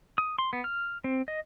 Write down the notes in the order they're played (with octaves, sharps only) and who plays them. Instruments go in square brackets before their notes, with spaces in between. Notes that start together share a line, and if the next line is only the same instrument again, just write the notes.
[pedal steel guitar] D#6
C6
B3
F6
C4
D#5